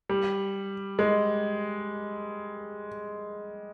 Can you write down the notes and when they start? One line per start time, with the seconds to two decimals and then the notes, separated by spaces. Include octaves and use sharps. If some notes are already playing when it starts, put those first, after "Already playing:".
0.09 G3
0.99 G#3